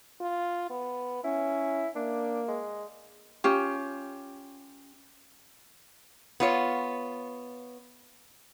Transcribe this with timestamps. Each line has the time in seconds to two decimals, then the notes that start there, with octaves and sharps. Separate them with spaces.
0.20 F4
0.70 B3
1.24 C#4 E4
1.96 A#3 D4
2.48 G#3
3.44 C#4 F4 G4
6.40 B3 F4 C#5